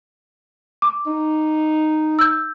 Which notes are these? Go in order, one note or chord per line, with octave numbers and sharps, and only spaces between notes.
D6
D#4
E6 G6